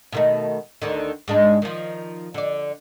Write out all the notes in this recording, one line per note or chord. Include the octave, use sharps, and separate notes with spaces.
B2 D#3 A3
D2 D3 D#3
G#2 G#3 D4
D#3 F3
D3 D5